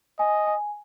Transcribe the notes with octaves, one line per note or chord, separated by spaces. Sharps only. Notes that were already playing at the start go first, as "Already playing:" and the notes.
D#5 G#5
G#5